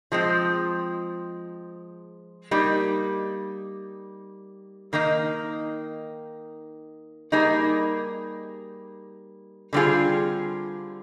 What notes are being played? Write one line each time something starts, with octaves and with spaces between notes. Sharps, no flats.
F3 G#3 C4
G3 A#3 D#4
D#3 A#3 D#4
G3 A#3 D#4 G#4
D3 G3 C4 F4 G#4